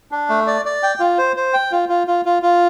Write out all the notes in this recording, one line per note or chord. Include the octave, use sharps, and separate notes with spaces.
D4
A3
D5
D5
G5
F4
C5
C5
G5
F4
F4
F4
F4
F4